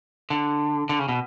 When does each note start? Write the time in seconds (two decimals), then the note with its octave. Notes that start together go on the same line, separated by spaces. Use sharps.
0.30 D3
0.89 D3
0.99 C#3
1.09 B2